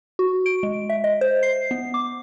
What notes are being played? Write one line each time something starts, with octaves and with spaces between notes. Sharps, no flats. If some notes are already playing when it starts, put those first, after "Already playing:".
F#4
D7
G#3
E5
D#5
C5
C7
B3
D6